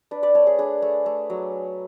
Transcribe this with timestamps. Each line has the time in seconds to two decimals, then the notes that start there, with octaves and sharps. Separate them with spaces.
0.11 D4 B4 D5
0.23 B4 D5
0.35 A3 A4 C#5
0.46 G#4
0.59 D4 G#4 B4
0.82 A3
1.06 A3
1.30 F#3